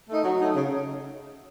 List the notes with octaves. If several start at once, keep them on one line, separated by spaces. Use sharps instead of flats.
A3 D#4
F#3
A3 D#4
C#3